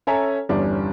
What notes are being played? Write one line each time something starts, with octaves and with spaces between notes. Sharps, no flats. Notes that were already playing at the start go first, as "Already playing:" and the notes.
C#4 A4 C#5 E5 G#5 A#5
G1 E2 G3 C#4 D4